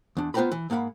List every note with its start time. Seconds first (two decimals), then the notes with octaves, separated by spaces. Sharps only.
0.17 E2 D4
0.34 B3 F4 C5 G5 A#5 B5
0.52 E3
0.70 G#2 A#3 F5 F#5 B5